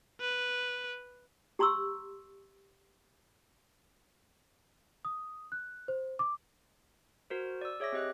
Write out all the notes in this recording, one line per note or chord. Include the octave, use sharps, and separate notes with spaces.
B4
G4 A#5 C6 C#6 E6
D#6
F#6
C5
D6
F#4 A#4 C5
D5 E6
G#4 C#5 E5 D6 A#6
C4 G4 D#5 F#6